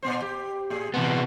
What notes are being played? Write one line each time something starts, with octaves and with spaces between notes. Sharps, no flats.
A#2 B3 C5
G4
A2 G#4
C3 E3 G3 G#3 B3